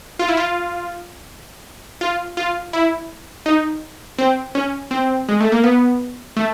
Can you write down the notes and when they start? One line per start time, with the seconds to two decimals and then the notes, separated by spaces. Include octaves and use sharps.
0.19 F4
0.28 E4
0.37 F4
2.01 F4
2.37 F4
2.73 E4
3.46 D#4
4.18 C4
4.55 C#4
4.91 C4
5.29 G#3
5.40 A3
5.52 A#3
5.64 B3
6.36 A3